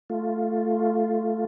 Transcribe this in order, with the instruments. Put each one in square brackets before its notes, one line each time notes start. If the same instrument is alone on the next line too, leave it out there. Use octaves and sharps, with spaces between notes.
[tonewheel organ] A3 F4